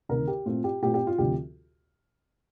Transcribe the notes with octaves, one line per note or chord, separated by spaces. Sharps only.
D2 C3 D#3 A#4
G4
A#2 A3 C4 F4
G4
A#2 A3 C4 G4
G4
F4
D2 C3 F3 G4